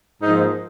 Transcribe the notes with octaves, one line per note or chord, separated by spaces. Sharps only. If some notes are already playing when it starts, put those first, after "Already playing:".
G#2 F3 A#3 D#4